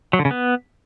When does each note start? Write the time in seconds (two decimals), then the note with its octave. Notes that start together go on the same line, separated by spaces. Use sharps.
0.13 F#3
0.19 D3
0.25 C#3
0.31 B3